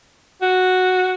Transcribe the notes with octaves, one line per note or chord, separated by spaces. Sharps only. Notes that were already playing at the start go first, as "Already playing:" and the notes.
F#4